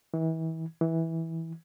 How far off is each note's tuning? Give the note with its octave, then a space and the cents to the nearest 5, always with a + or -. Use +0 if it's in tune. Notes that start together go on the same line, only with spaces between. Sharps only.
E3 -35
E3 -15